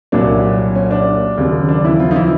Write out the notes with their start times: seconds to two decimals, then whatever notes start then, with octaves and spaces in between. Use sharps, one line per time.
0.12 C2 A#2 F#3 D4
0.75 C#4
0.91 D4
1.38 D#2 C#3 F#3
1.69 D4
1.84 E3 E4
2.00 F3 F4
2.11 D#4
2.16 E3 E4